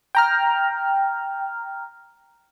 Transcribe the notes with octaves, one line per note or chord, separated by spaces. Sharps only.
G5 A#5 F6